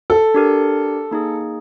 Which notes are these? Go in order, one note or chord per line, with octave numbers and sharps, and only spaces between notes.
A4
D4 G4 A#4
A#3 D#4 G#4